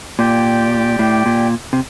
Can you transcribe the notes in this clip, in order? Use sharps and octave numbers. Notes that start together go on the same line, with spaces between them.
A#2 G4 D5 G5
A2
A#2
C3